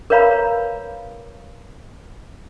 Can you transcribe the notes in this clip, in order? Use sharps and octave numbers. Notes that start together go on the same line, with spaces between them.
A#4 B4 C#5 F5 A#5 B5